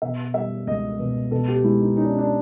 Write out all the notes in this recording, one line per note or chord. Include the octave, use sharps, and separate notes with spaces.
B2 E5
G3 E5
C#2 D#5
B2
B2 A4
G4
G#3 E4
D#4
C#4 D#4
D4
D4